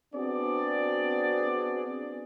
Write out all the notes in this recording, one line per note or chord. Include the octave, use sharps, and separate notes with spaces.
B3 C4 D4 F#4 G#4 D5